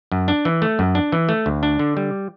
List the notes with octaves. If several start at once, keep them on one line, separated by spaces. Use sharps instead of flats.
F#2
D4
E3
A3
F#2
D4
E3
A3
D2
D4
D3
G3